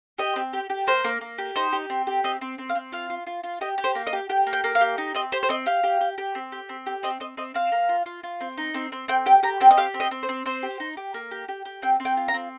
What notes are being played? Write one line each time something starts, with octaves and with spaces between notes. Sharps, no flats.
G4 D#5
C4
G4
G4
A#3 C5
A#3
A#3
G4
D#4 C5
G4
C4
G4
C4 D#5
C4
C4
F5
C4
F4 F5
F4
F4
F4
G4 D#5
G4
C5
A#3
D#5
G4
G4 G5
A#3
G5
A#3
F5
G4
D#4
C4 D#5
G4 C5
C5
C4 D#5
G4 F5
G4
G4
G4
C4
G4
C4
G4
C4 D#5
C4 D#5
C4 D#5
C4 F5
A#3
F4
F4
F4
C4
D#4
C4
C4
C4 G5
G4 G5
G4 A#5
C4 G5
D#5
G4 F5
C4
D#5
C4
C5
C4
C4 C5
G4
D#4
G4
A#3
G4
G4
G4
C4 G5
C4
G5
F4
A#5
C4